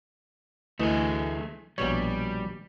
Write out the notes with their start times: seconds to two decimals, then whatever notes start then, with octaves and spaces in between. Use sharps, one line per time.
0.79 D2 E3 A3 G#4 D#5
1.78 A#1 B2 G3 C#5